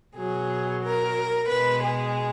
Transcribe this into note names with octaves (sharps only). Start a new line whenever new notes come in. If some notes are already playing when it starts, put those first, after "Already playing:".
B2 F#3 G#4
A#4
B2 G#3 B4
G#4